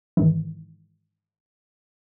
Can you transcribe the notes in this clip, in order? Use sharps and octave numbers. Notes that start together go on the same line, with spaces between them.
G#2 D#3 E3